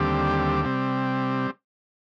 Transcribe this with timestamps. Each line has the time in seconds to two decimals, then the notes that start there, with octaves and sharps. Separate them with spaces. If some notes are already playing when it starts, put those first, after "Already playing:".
Already playing: D#2 D3 G3 C4 G4
0.65 C3 G3 C4